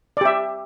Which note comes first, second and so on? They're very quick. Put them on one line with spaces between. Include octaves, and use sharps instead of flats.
D5 G4 E5